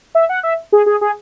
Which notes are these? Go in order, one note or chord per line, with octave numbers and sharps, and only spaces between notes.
E5
F#5
E5
G#4
G#4
G#4